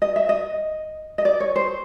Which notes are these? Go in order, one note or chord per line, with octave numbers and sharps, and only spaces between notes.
D#5
E5
D#5
D#5
D5
C#5
C5